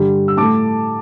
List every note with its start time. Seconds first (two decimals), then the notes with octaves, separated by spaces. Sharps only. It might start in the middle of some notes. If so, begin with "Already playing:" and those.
Already playing: G2 D3 G3
0.28 E6
0.37 A2 A3 A5 D6